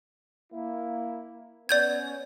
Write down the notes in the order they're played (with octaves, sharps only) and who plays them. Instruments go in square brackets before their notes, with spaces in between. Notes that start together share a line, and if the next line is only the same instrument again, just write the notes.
[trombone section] A#3 E4
[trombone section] B3 C#4 [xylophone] D5 G6 G#6